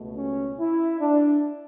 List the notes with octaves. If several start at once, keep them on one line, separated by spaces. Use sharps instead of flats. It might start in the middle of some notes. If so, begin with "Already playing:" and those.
Already playing: C#2 B2 A3
C#4
E4
D4